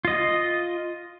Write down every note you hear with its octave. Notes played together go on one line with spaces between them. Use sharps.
F4 D#5